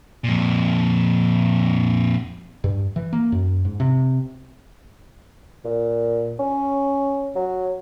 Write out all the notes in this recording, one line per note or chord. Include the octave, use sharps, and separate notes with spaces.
F2 A#2
G2
E3
A#3
F#2
G#2
C3
A#2
C#4
F#3